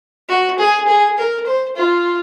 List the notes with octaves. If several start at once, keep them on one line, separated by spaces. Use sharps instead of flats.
F#4
G#4
G#4
A#4
C5
F4